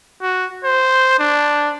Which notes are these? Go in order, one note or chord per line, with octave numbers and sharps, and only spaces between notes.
F#4
C5
D4